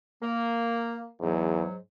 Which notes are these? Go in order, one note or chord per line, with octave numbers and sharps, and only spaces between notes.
A#3
E2 G#2 F#3